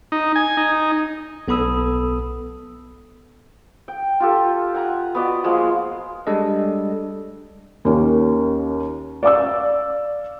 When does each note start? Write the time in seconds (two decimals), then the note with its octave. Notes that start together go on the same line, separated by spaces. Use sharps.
0.12 D#4
0.36 G#5
0.57 D#4
1.48 B1 B3 A4 B5 D#6 E6
3.88 G5
4.20 F4 G4 A4
4.74 F#5 G#5 A#5
5.15 B3 F#4 D5 D#5
5.44 F3 G#3 A#3 F4
6.27 G3 G#3 D4 A4 D#5
7.85 D#2 A#3 C#4
9.23 D5 F5 D6 E6